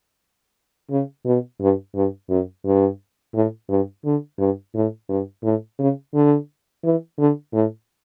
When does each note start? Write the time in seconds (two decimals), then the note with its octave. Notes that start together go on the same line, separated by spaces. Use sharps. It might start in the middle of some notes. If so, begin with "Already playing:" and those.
0.90 C#3
1.26 B2
1.60 G2
1.95 G2
2.29 F#2
2.65 G2
3.34 A2
3.69 G2
4.05 D3
4.39 G2
4.75 A2
5.09 G2
5.43 A2
5.79 C#3
6.14 D3
6.84 E3
7.19 D3
7.53 A2